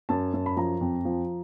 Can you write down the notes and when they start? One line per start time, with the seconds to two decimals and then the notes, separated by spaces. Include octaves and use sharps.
0.09 F#2 A5
0.33 F#2
0.46 B5
0.57 F3 A#5
0.81 F2
1.05 F3